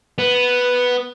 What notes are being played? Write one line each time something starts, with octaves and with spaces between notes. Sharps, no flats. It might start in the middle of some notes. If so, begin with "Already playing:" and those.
B3